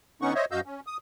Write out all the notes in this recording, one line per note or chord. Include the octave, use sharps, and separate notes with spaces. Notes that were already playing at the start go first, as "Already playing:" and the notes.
D3 B3 C#4 D#4 F#5 C#6
C5 C#5 D#5 E5
F#2 F#4 D#5 F5 E6 G6
C#4
D#6